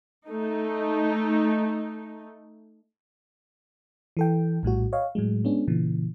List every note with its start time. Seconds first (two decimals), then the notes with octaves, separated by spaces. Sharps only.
0.28 A3 D#4
4.17 E3 A4 G5
4.63 A#1 A2 G3 F#4
4.93 C#5 D#5 F5
5.15 A2 F#3 G#3
5.45 G#3 B3 C#4 D4
5.68 A#2 C#3 E3